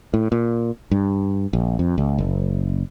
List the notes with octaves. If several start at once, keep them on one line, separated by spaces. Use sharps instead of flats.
A2
A#2
G2
A#1
F2
C#2
F#1